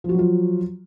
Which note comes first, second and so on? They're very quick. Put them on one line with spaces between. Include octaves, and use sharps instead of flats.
F3 F#4 F#3 F4